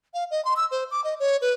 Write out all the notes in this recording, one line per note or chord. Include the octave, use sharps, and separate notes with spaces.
F5
D#5
C6
E6
C5
D6
D#5
C#5
B4